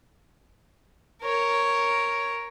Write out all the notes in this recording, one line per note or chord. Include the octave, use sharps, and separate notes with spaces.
A#4 C#5